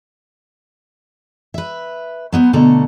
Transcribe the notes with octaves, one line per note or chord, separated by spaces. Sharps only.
B4 E5
F#3 B3 C5
B2 D3 A3 A#5